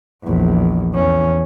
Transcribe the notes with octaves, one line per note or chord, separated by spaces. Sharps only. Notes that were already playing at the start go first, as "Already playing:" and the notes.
A#1 E2
E2 C#4